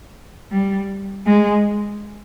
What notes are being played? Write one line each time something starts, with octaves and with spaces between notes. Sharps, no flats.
G3
G#3